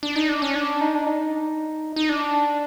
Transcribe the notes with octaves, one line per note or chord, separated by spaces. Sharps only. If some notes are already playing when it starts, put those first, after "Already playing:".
D4
D#4
D4
C#4
D4
D#4
D4
D#4
D#4
D4